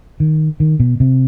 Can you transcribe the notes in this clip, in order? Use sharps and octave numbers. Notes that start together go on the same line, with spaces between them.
D#3
D#3
B2
C3